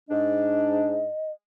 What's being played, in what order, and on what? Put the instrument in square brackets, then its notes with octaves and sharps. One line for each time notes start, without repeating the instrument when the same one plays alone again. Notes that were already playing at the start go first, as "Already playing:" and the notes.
[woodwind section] G#2 D4 [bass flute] D#5